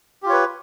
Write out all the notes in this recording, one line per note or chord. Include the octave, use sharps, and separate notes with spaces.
F4 G4 B4 C#5